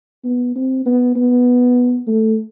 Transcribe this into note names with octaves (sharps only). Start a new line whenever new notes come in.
B3
C4
B3
B3
A3